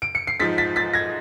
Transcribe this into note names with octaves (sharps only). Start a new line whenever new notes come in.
D7
C#7
C7
G#2 F3 A6 B6
A6 B6
A6 B6
G#6 A#6